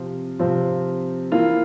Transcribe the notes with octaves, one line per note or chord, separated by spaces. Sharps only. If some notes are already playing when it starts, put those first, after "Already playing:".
Already playing: C3 F3 C4 F4
C3 F3 C4 F4
E3 A#3 F4